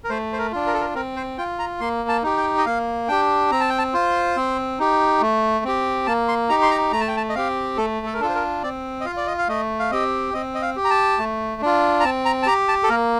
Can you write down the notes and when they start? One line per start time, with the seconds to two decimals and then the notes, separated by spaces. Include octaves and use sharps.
0.04 A#4
0.10 A3 C5
0.33 C5
0.38 A#4
0.52 D4 F4
0.67 A#4
0.74 A4
0.81 A#4
0.95 C4 A#4
1.16 C5
1.37 F4 G5
1.59 A#5
1.80 A#3 C6
2.09 A5
2.23 D#4 G4
2.37 G5
2.58 D#5
2.66 A#3 F5
3.08 D4 G4 G5
3.51 C4 A#5
3.61 A5
3.69 G5
3.78 A5
3.94 F4 C5
4.37 C4
4.79 D#4 G4
5.21 A3
5.65 C4 G4
6.07 A#3 A5
6.28 C6
6.49 D#4 G4 A#5
6.62 C6
6.71 A#5
6.92 A3 A#5
7.00 A5
7.08 G5
7.17 A5
7.29 D#5
7.35 C4 G4 F5
7.77 A3 A4
8.06 A4
8.14 A#4
8.20 D4 F4 A4
8.29 C5
8.35 A#4
8.63 C4 D5
9.00 D#5
9.05 F4 F5
9.17 D5
9.27 D#5
9.38 F5
9.48 A3 D#5
9.79 F5
9.91 C4 G4 D#5
10.34 C4 D#5
10.54 D#5
10.62 F5
10.76 G4
10.84 A#5
10.90 A5
11.19 A3
11.62 D4 F4
12.00 A#5
12.04 C4 A5
12.25 A#5
12.43 A5
12.46 G4 A#5
12.68 A5
12.83 A4
12.89 A#3 A#4